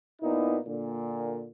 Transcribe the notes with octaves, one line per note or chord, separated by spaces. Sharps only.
A#2 B3 D#4 E4
A#2 D3